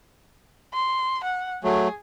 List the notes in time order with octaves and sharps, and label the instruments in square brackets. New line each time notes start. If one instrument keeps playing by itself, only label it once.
[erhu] C6
F#5
[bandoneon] F#3 A3 [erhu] G#4